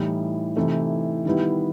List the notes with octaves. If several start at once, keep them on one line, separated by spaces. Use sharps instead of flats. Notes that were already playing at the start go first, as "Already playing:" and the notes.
Already playing: A2 E3 G3 D#4
C3 E3 A3 D#4
D#3 G3 B3 E4